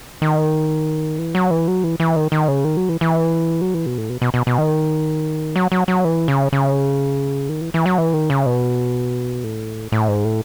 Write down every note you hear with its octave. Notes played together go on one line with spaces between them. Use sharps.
D#3
E3
F#3
E3
F#3
E3
E3
D#3
D#3
C#3
D#3
F#3
E3
E3
F#3
E3
B2
A2
B2
B2
B2
B2
D#3
F#3
F#3
F#3
E3
C#3
C#3
D#3
E3
E3
F#3
E3
D#3
C#3
B2
A2
A2
G#2
A2